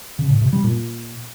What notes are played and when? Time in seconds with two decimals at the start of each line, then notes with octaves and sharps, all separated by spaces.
0.19 C#3
0.30 A2
0.41 C3
0.53 G3
0.64 A#2